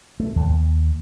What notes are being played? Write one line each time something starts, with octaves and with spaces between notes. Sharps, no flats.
A3
D#2